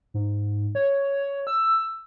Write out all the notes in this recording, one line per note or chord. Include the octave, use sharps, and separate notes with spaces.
G#2
C#5
E6